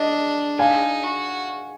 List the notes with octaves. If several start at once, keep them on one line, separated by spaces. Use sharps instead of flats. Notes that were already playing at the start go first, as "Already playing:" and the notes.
Already playing: D4 D#5
D#4 F5 G#5
F#4